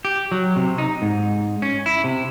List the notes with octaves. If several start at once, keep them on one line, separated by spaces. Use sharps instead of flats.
G4
F#3
C3
D#4
G#2
C#4
E4
C3